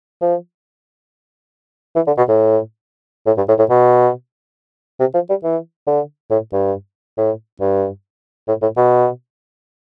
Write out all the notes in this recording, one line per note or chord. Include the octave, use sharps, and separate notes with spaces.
F3
E3
D3
B2
A2
A2
G2
A2
A2
B2
C3
F3
G3
E3
D3
A2
G2
A2
G2
A2
A2
B2